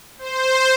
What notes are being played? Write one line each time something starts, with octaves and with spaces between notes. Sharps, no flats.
C5